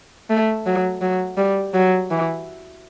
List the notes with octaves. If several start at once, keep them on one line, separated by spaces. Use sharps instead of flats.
A3
F#3
F#3
G3
F#3
E3